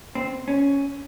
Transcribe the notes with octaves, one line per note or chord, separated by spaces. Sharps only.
C4
C#4